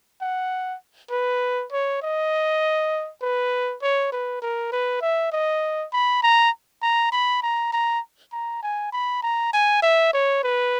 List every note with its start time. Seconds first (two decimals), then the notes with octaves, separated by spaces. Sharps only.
0.21 F#5
1.11 B4
1.72 C#5
2.02 D#5
3.22 B4
3.82 C#5
4.12 B4
4.42 A#4
4.72 B4
5.01 E5
5.32 D#5
5.93 B5
6.23 A#5
6.82 A#5
7.12 B5
7.43 A#5
7.72 A#5
8.32 A#5
8.62 G#5
8.92 B5
9.22 A#5
9.53 G#5
9.82 E5
10.13 C#5
10.43 B4